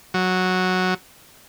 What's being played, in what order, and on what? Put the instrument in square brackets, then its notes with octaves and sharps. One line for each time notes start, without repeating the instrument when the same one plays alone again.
[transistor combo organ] F#3